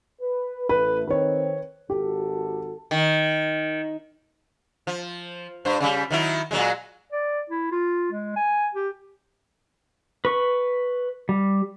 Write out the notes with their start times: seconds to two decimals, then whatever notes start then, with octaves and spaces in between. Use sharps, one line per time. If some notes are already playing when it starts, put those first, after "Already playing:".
0.21 B4
0.69 A1 A3 B4
1.07 D#3 C4 B4 C#5
1.90 G#1 F#4 G4 A4
2.91 D#3
4.87 F3
5.65 G2 C5
5.80 C#3 G3
6.11 D#3 F#3 E4
6.51 A#2 F#3 G#3
7.12 D5
7.50 E4
7.72 F4
8.12 G#3
8.36 G#5
8.75 G4
10.25 B4 C#6
11.29 G3